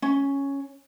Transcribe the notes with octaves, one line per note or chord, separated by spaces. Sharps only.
C#4